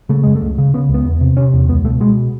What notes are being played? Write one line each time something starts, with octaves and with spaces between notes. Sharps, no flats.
C#3 A3
F#2 G#3
A3
C#2
C#3
C#3 B3
C#2
B3
E2
C3
C3 C#4
E2
C#2 B3
B2 A3
B2 G#3